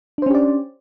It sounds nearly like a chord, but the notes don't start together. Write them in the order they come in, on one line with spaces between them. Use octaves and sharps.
D4 C5 C#4 G4 D5